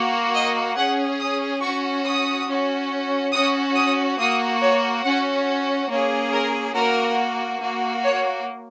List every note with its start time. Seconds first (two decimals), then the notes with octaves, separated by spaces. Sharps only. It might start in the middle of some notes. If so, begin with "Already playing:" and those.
Already playing: A#3 F#4
0.34 D#5
0.76 C#4 G#4 F#5
1.19 D#6
1.61 C#4 F#4 C#6
2.05 D#6
2.47 C#4 F#4
3.32 C#4 F#4 D#6
3.76 D#6
4.18 A#3 F#4 D#6
4.61 C#5
5.04 C#4 F#4 F#5
5.90 A#3 C#4 G#4 C#5
6.32 A#4
6.75 A#3 F#4 A#4
7.61 A#3 F#4
8.04 C#5